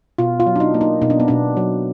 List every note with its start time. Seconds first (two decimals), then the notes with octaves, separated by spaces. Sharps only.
0.18 B2 F4
0.40 F4
0.46 F#3
0.56 D4
0.60 D#4
0.74 A#3
0.81 D#4
1.02 B2 D#4
1.10 D4
1.20 B3
1.28 B2 D4
1.57 F#3